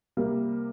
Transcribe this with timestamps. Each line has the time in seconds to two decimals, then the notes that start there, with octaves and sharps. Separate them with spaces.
0.17 C3 G3 A#3